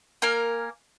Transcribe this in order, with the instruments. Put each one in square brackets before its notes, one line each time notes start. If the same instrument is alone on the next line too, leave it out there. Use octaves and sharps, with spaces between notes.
[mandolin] A#3 A#4 G#5